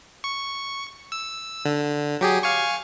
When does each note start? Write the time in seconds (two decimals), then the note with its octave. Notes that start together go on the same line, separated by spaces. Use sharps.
0.24 C#6
1.12 E6
1.65 D3
2.21 F#3 G4 G#4
2.43 F5 G#5 C#6